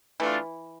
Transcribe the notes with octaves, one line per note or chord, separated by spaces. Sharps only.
E3 A3 D4 F4